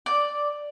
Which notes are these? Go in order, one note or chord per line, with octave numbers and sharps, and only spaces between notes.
D5